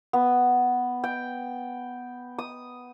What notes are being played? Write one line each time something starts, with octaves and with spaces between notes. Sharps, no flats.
B3
G5
D#6